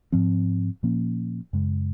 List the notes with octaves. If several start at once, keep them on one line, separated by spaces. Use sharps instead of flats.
G#2 F3 C4
A#2 F3 A#3 C#4
F#2 C#3 G#3